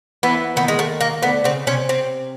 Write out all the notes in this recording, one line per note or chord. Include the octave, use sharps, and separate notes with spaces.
E2 E3 B3
D#2 D#3 B3
G#3
A3
A#3
D2 D3 B3
C#3 C4
C3 C#4
C4